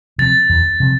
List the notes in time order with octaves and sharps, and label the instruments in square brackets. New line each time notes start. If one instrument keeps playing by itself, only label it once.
[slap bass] C3 F3 C4 [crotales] A6
[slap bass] E2
C3 F3 C4